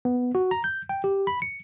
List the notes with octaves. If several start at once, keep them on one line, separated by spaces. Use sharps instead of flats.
B3
F#4
A#5
G6
G5
G4
B5
C#7